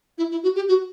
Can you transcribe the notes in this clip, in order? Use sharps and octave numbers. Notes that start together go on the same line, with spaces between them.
E4
E4
F#4
G4
F#4